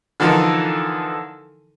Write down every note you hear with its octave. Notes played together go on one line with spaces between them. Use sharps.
D3 E3 F3 D#4 A4 A#4